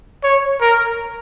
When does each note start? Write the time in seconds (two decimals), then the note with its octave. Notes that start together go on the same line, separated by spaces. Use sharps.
0.23 C#5
0.61 A#4